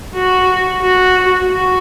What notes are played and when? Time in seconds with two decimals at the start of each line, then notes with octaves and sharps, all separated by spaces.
0.15 F#4
0.82 F#4
1.49 F#4